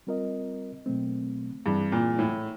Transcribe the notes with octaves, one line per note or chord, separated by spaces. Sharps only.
G3 C4 F4 A#4 D#5
B2 F#3 A3 C4
G2 E3 G3 C4 E4 G#4
A#2
A2